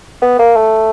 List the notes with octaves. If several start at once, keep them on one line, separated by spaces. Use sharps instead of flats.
B3
A#3
A3